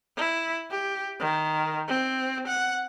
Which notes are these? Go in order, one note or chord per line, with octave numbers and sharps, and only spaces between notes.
E4
G4
D#3
C4
F#5